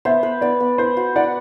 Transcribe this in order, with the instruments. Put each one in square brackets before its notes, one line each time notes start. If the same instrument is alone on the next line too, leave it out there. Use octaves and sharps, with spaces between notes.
[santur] B3 [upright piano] C5 E5
[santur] B4
[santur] B3 [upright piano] D5
[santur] B3
[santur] B4 [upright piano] C5
[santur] F#4
[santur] B4 [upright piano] D5 F#5